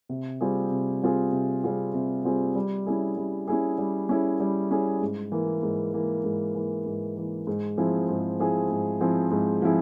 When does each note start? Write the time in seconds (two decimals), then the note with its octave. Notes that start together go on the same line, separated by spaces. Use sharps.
0.09 C3
0.41 G3 C4 F4 G#4
0.71 C3
1.03 G3 C4 F4 G#4
1.33 C3
1.64 G3 C4 F4 G#4
1.94 C3
2.25 G3 C4 F4 G#4
2.55 G3
2.87 C#4 E4 G#4
3.17 G3
3.48 C#4 E4 G#4
3.78 G3
4.09 C#4 E4 G#4
4.40 G3
4.71 C#4 E4 G#4
5.01 G#2
5.32 E3 A#3
5.63 G#2
5.94 E3 A#3
6.24 G#2
6.55 E3 A#3
6.86 G#2
7.16 E3 A#3
7.47 G#2
7.77 F3 C4 E4 G#4
8.09 G#2
8.40 F3 C4 E4 G#4
8.70 G#2
9.01 F3 C4 E4 G#4
9.31 G#2
9.62 F3 C4 E4 G#4